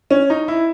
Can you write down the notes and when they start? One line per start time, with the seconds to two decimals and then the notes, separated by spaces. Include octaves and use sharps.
0.10 C#4
0.30 D#4
0.48 E4